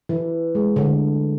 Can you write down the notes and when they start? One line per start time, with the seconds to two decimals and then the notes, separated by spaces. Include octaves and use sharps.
0.09 E3
0.55 G#3
0.76 D3